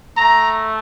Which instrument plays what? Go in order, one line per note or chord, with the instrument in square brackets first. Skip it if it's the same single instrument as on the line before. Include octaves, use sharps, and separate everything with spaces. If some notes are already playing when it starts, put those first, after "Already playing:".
[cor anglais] A3 [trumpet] A#5